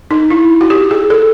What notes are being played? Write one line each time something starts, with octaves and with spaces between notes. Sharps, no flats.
D#4
E4
F#4
G4
G#4
A4